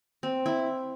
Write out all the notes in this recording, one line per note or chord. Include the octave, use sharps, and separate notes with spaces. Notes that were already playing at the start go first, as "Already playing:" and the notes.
C4
E4